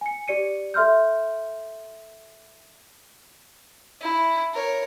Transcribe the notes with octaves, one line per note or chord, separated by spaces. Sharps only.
G#5 C#7
G4 D5 C#7 D#7
A4 E5 C6 F6 G6
E4
A#4 C#5